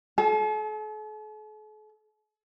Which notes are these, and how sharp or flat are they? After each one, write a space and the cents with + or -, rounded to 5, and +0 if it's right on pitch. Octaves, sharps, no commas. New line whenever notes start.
A4 -45 A5 -20